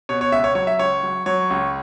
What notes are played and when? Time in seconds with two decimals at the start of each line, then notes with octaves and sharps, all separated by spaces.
0.09 B2 C#5
0.21 C#5
0.32 C#2 E5
0.44 C#5
0.55 F#3 C#5
0.67 E5
0.79 C#2 C#5
1.03 F#3
1.26 F#3 C#5
1.50 C#2